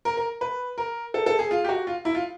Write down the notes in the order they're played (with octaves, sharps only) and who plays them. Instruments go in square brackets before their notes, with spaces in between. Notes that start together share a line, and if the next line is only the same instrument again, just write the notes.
[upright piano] A#4
A#4
B4
A#4
A4
A4
G#4
F4
G4
F#4
F4
E4
F4